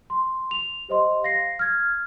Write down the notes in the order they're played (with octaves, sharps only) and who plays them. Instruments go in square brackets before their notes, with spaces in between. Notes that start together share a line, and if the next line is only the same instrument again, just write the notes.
[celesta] C6
F7
G4 C5 D#5 C6
F5 A#6 C7
F6 G#6